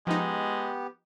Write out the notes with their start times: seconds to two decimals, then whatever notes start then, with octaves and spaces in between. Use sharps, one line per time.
0.07 F3 G#3 B3 D#4 G4